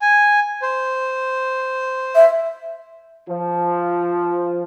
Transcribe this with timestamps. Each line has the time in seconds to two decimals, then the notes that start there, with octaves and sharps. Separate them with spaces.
0.02 G#5
0.62 C5
2.15 E5
3.28 F3